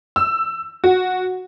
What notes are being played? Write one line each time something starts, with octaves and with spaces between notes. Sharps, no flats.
E6
F#4